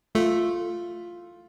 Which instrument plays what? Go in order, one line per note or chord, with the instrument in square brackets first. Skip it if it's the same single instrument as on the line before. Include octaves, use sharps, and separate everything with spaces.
[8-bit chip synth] A3 [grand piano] F4